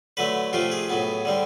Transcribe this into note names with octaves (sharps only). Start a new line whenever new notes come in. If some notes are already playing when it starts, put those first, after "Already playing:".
D3 F#3 A3 B4
C3 F3 A3 F4
G#4
A2 F#3 B3
D3 G3 C4